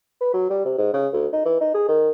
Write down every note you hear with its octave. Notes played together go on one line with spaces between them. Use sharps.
B4
F#3
G3
C3
G#2
C#3
D2
D#4
E3
D#4
G#4
D#3